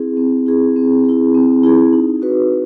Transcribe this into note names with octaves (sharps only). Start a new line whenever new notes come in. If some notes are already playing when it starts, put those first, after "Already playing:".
Already playing: C4 E4 G#4
C4
E4 G#4
C4
E4 G#4
C4
E4 G#4
D#4
F#4 B4